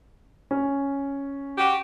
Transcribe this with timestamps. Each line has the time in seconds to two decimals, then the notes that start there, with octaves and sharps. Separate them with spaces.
0.51 C#4
1.57 F#4 G4